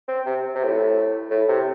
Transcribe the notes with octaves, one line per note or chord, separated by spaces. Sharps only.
C4
C3
C3
A2
A2
C3